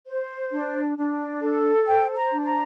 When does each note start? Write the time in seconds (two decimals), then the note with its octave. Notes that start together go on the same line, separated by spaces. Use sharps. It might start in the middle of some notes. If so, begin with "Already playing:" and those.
0.07 C5
0.52 D4
0.97 D4
1.41 A4
1.86 C5 G5
2.16 A#5
2.31 D4
2.45 A#5